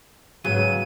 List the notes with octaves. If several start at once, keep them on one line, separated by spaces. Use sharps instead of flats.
G#2 C#3 F#3 B3 D#7